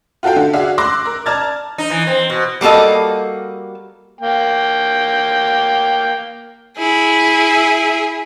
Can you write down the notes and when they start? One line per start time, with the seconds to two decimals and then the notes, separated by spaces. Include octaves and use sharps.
0.23 F4 F#4 A4 F5 G5
0.36 D3
0.53 F#4 G#4 D5 E5 F5
0.78 C6 D6 E6 F#6 A#6
1.06 A#4
1.26 D5 A5 A#5 F6 G#6 A6
1.78 D#4
1.90 E3
2.07 C4
2.30 B2
2.61 G3 A#3 F#4 A4 D#5
4.21 A#3 G5
6.78 E4 G#4 E5